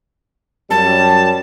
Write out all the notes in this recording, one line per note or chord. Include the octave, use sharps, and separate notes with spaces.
F#2 G3 A5